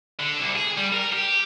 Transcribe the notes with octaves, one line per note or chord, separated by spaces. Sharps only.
D3
C2
G#4
G3
A#4
G4